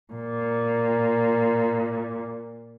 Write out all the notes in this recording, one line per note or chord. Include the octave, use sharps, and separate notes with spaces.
A#2